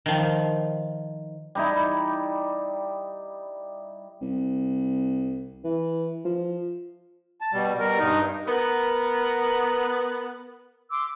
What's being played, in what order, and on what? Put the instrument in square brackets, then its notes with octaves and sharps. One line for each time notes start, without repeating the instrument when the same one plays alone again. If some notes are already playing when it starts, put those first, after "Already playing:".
[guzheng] D#3 F3
[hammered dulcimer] G3 D#4 E4
[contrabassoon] C2
E3
F3
[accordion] A5
B2 G3
B2 G3 A#4
G2 D#4
[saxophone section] B3 [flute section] A#4
[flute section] C6 D6 E6